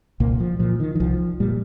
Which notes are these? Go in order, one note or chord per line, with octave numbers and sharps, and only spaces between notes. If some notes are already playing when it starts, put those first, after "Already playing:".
C2 A#2 A#3
F3
A#2 F3
D#3
D#3
C2 F3
A#2 G3